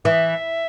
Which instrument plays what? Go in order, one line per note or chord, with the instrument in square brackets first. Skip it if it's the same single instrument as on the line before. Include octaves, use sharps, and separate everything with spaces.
[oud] E3 [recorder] E5